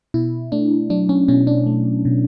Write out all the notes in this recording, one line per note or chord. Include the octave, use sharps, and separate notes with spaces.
B2 E4
A3 D4
F#3 D4
C#4
B2 C#4
D4
A3
B2